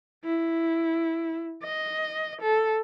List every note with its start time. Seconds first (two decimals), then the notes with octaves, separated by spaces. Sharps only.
0.24 E4
1.63 D#5
2.42 A4